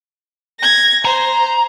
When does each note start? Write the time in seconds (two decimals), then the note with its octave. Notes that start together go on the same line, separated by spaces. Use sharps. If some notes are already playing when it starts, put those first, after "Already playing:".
0.59 G#6 A#6
1.05 C5 A#5